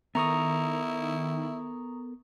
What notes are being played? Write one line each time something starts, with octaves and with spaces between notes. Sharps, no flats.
D#3 B3 E4 A4 A#4 A#5 C#6 D#6